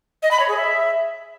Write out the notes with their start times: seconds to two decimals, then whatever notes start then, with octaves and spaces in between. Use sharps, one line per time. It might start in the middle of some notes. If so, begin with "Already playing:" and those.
0.22 D#5
0.31 B5
0.40 C#5
0.48 G#4
0.57 E5